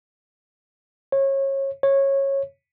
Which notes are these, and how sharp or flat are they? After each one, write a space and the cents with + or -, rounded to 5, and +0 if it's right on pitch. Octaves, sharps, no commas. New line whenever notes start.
C#5 -25
C#5 -15